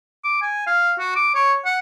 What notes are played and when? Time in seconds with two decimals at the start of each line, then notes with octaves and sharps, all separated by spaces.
0.24 D6
0.42 G#5
0.67 F5
0.99 F#4
1.16 D6
1.35 C#5
1.65 F#5